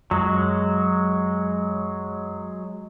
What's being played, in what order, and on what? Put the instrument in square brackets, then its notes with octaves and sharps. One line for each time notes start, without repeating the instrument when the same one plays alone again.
[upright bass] F#2 [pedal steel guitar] F#3 G#3